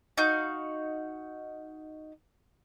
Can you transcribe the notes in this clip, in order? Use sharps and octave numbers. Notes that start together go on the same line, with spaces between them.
D#4 F#4 F5 G6